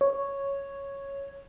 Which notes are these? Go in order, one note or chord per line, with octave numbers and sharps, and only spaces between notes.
C#5